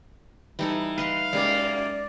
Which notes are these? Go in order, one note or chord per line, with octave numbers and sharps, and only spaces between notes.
E3 G3 D#4 A4
B4 D#5 F5 C6
F#2 G#3 A#3 G4 D5